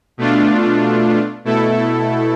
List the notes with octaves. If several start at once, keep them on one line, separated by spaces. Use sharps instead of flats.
B2 A3 D4 F4
B2 A3 E4 A4